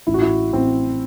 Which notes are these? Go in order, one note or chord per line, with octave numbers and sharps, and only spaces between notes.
A1 E4
F#4
E4
A1 C4